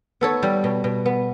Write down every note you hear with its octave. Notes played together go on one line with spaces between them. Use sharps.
B3 A4 C#5
G3
B2
B2
B3